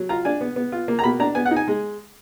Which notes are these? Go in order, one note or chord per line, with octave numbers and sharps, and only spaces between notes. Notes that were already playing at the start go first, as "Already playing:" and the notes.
Already playing: F#3
F4 A#5
D4 G#5
B3
B3
F4
A#3
A#5
B2 B5
D4 A#5
B3 G#5
F#5
D#4
G#5
G#3